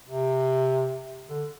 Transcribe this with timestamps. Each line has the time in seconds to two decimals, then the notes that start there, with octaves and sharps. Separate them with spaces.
0.08 C3
1.29 D3